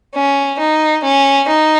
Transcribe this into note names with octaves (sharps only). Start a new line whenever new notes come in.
C#4
D#4
C#4
D#4